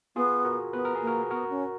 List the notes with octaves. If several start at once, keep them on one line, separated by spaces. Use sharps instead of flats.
B3 F4 G#4
F#4 A#4
B3 B4
A#4
G#4
A#3
F#4 A#4
B3 F#4 A#4
C#4